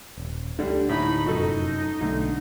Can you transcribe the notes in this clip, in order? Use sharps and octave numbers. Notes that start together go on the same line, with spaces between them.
D#1
D2 D3 G3
A2 D#4 B5
F1 F#2 A2 D#4 F#4 A4
B1 D3 A3